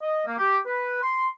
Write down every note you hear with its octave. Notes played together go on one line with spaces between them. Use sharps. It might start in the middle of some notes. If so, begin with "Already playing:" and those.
D#5
A#3
G4
B4
C6